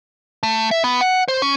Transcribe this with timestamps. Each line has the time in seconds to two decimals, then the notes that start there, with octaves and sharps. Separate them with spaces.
0.43 A3
0.71 E5
0.84 B3
1.01 F#5
1.28 C5
1.42 C#4